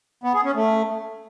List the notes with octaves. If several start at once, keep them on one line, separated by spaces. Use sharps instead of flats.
B3
G#4
C#4
A3